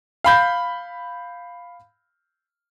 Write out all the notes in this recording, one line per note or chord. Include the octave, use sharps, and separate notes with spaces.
F5 B5 G6